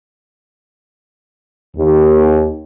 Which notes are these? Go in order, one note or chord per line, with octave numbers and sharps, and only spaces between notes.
D#2